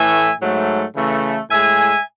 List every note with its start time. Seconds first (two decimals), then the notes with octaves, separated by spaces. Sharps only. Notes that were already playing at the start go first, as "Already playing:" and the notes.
Already playing: A2 E3 A3 E5 G#5
0.40 G#2 F#3 A3
0.95 C#3 E3 A3
1.50 A2 G#3 E5 G#5